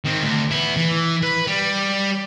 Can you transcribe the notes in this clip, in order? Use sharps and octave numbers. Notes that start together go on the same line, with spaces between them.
D#3 C4
D2
B3 E4
E3
B4
G3